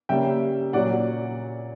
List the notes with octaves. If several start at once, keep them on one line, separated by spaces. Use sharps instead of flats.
C#3 G3 A#3 C#4 E5 G5
A#2 F#3 C#4 D5 F#5